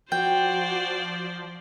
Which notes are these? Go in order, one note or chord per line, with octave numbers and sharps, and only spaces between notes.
F3 F#4 C5 D5 G5